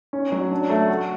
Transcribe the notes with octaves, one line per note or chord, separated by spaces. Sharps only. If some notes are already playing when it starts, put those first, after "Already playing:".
C#4
F#3
D4
A3
F#4